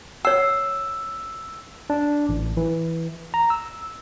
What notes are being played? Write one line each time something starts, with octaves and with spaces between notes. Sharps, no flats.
C#5 F#5 E6
D4
A1
E3
A#5
E6